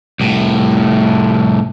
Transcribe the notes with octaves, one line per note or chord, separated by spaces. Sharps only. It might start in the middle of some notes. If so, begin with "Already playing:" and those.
C2 A2